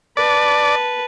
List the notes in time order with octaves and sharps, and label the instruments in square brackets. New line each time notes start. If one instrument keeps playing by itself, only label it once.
[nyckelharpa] B4 A5 [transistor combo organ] D5